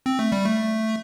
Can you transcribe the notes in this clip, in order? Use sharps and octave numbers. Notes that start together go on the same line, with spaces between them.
C4
A3
G3
A3